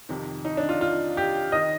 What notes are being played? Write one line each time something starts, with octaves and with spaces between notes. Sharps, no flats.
F2 C3 D#3
D#4
D4
F4
F4
G4
D#3 D#5